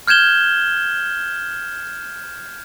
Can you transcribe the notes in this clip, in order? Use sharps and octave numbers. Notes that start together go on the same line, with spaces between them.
F6 G6 G#6 E7 G7